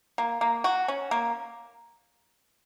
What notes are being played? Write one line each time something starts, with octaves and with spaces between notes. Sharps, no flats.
A#3
A#3
F#4
C#4
A#3